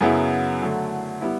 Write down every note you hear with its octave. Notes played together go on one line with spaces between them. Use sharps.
F#2 C#3 F#3 B3 E4
D3 F#3 A3
G3 B3 E4